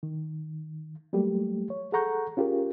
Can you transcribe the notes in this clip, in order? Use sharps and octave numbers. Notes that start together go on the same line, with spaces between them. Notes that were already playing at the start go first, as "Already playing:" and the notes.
D#3
F#3 G3 A3 A#3 G4
C#5
G#4 A4 F#5 A#5 C#6 G6
C#4 F4 G4 G#4 A#4